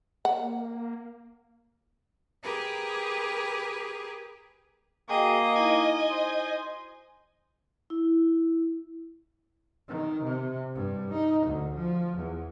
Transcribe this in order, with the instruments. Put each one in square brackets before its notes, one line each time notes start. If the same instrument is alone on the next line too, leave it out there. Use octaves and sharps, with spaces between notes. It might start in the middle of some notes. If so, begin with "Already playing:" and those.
[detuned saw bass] A#3 [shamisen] F#5
[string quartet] G4 G#4 A#4 B4
[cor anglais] A#3 [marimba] F#4 G5 [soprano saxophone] G#4 [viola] D#5
[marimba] D#4 E4 [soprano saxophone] G#5
[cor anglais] C5
[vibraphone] E4
[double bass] D#3
C3
G2
D#4
D2
F3
E2